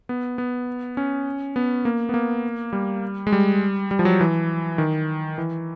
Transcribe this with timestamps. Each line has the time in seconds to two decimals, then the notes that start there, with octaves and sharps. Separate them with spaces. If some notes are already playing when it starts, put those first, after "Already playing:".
0.09 B3
0.38 B3
0.97 C#4
1.56 B3
1.85 A#3
2.09 B3
2.14 A#3
2.73 G3
3.27 G#3
3.32 G3
3.91 G3
3.99 F3
4.05 F#3
4.21 E3
4.78 D#3
5.38 E3